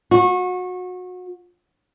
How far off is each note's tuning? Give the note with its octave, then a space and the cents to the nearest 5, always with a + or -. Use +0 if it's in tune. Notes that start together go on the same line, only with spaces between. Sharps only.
F#4 -30